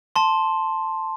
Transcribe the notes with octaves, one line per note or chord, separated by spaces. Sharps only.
A5 C6